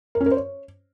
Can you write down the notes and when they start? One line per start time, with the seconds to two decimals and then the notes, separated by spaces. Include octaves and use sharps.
0.15 A#4
0.20 C#4
0.26 A#4
0.31 C5
0.37 C#5